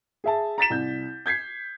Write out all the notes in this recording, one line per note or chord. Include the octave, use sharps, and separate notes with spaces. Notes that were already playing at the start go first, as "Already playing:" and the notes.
G#4 E5 A5
A#5 A6 B6 E7
C2 G6
G6 G#6 B6 C7